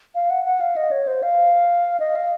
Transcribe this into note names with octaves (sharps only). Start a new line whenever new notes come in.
F5
F#5
F#5
F5
D#5
C#5
C5
F5
D#5
F5